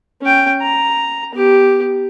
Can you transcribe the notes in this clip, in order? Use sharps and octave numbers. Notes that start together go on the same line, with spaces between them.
C#4 G5
A#5
B3 G4